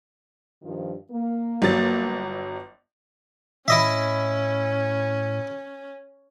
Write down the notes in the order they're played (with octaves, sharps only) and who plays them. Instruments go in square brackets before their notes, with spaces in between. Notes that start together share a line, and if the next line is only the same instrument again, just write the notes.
[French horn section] G2 D#3 F3
A#3
[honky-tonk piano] G1 F#3 A6
[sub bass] A2 [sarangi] C#4 [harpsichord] E4 D#5 E5